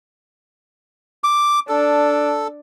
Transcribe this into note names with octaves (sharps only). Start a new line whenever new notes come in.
D6
D4 A4